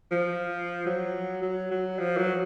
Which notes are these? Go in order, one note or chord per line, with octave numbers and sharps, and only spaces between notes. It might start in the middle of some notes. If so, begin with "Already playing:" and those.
F3
F#3
F#3
F#3
F3
F#3